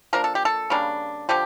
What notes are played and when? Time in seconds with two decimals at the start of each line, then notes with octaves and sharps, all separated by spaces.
0.13 F3 A#3 D4 A#4
0.24 A4
0.35 G4
0.45 A4
0.70 C#3 G3 A#3 D4
1.29 D3 F3 G4